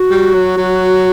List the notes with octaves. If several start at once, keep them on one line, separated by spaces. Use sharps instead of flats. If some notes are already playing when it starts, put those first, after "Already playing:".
Already playing: F#4
G3
F#3
F#3